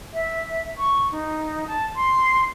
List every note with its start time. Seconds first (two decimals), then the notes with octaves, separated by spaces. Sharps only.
0.14 E5
0.78 C#6
1.12 D#4
1.67 A5
1.96 C6